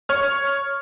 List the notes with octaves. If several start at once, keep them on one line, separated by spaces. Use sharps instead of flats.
C#5 F6